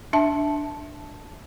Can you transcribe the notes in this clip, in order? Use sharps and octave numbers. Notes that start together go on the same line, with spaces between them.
D4 E5 A5